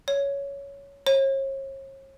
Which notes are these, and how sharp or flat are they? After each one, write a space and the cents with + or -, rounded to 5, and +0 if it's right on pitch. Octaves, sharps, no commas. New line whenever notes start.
C#5 +10
C#5 -40